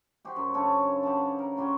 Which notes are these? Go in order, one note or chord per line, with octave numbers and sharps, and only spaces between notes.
F#4 G4 C5
F#2
C#3 D4 A4 C#5
G4 B4 F#5 A5
A#4
G3 C#4 F#4 C6